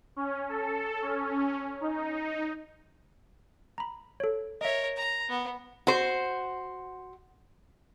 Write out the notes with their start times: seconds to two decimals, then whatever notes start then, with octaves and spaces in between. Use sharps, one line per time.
0.16 C#4
0.49 A4
1.02 C#4
1.81 D#4
3.78 A#5 B5
4.20 A4 C#5
4.61 A#4 C#5 D#5 E5
4.97 A#5
5.29 B3
5.87 F#4 C5